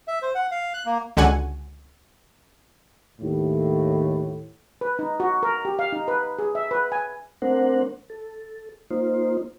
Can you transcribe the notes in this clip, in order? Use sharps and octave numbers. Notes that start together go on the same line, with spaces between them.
E5
C5
F#5
F5
F#6
A#3
C#2 D3 F#4 F#5 G#5
D#2 A2
B4
D#4
F#4
A#4
G4
F5
D#4
B4
G#4
E5
B4
G#5
A3 C4 D4 A#4 C5 F#5
A4
A#3 D#4 F4 C5